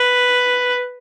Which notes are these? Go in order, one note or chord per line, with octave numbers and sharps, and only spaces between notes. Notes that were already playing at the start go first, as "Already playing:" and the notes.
Already playing: B4